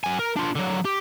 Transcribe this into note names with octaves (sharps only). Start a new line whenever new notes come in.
F#3 G#5
A#4
D4 F4
D3 F#3
G4